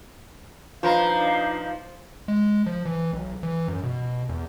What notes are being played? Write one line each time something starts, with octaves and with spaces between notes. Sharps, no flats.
F3 D4 D#4 F4 B4 F5 A#5
G#3
F3
E3
B1
E3
F#2
B2
E2